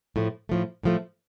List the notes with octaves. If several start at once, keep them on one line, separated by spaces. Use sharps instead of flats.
A2 F3 A3
A2 F3 A3
A2 F3 A3